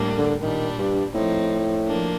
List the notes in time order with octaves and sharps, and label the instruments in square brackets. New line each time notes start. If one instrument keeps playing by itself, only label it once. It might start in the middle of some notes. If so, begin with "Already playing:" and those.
Already playing: [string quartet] A2 G3 A#3 D4
[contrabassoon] D3
[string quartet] A#2 G3 D4 [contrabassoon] D#3
[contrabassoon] G2
[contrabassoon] A2 [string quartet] F3 C4 D#4
[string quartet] F3 A#3 D4